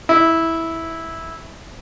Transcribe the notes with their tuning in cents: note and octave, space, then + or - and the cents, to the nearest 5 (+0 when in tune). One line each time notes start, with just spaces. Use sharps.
E4 -10